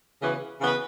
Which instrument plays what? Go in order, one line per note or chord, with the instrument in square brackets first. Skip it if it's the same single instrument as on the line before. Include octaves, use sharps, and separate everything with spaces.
[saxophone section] C#3 E3 B3 F#4 B4
C#3 E3 B3 F#4 B4